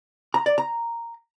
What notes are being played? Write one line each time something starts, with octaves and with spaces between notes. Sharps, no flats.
A#5
D5
A#5